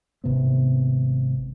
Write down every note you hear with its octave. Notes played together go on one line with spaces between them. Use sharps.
G#1 C3 B3 C4